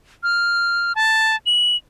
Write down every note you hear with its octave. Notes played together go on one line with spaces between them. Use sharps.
F6
A5
F#7